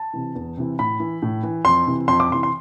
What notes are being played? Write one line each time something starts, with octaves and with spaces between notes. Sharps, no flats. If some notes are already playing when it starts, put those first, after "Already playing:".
Already playing: A5
C3 E3
E2
C3 E3
A2 B5
E3
A2
E3
F2 C6
C3 E3
F2 C6
D6
C3 E3 C6
C6